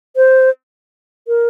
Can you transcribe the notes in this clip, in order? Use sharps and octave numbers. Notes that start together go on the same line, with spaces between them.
C5
A#4